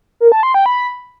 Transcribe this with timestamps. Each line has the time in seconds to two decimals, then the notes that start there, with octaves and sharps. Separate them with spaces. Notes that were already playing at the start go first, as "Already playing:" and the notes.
0.20 A#4
0.32 A5
0.43 C6
0.54 G5
0.66 B5